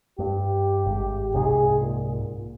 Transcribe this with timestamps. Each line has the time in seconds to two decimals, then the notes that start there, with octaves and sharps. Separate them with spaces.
0.19 G2 G4
0.86 G#1
1.34 C2 G#2 C3 G#4
1.81 A#2